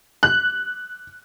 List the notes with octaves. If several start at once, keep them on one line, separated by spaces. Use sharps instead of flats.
F#6